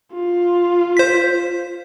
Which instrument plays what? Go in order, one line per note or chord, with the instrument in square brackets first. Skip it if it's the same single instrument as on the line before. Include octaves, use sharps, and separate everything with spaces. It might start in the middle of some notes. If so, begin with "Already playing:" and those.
[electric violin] F4
[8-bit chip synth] C5 B6